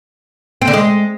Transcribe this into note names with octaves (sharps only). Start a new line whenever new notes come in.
C4
D3
G#3